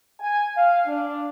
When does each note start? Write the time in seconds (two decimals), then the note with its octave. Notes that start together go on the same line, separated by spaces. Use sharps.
0.20 G#5
0.55 F5
0.86 D4